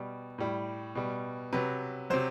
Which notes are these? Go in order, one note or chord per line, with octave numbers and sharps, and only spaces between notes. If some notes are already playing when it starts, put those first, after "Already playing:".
Already playing: B2 G3
A2 G3
B2 G3
C3 F#3 B4
C3 F#3 C5